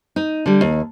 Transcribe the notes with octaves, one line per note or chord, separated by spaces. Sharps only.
D#4
D3 G3
D#2